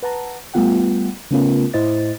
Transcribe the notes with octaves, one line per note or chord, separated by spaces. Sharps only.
B4 F#5 A5 A#5
G3 A3 B3 F4 F#5 G5
C#3 A3 B3 C#4 F4 A#4
A2 E4 C5 D#5 A6